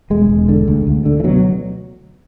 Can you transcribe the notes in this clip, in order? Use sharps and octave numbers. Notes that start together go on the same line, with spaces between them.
E1 G#3
E1
D3
D2
D2
D3
E3
B2 F#3